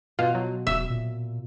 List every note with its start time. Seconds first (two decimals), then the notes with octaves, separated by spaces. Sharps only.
0.19 B2 F4
0.35 F#3
0.67 D#1 E5
0.90 A#2